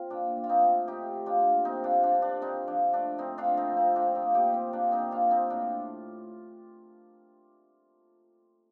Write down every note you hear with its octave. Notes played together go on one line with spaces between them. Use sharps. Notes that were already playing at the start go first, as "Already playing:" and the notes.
Already playing: C4 F4
A#2 D4
A#2
F4
C4 D#4
A3
C3 D#4 G4
D#3
D4 F4
A#3
C3 C4 D#4
D4 F4
C3
D4 F4
D#3
D4
D3 C4 D#4
F3 D4
A3 D4
D3 C4 D#4
D4 F4
D3
C4 D#4
F3
C4 D#4
D#3 D4 F4
D#4 G4
A#3
D#4 G4
D#3
C4
A#3 D4
C4 D#4
D#3
D4 F4
A#3
C4 D#4
A2 D4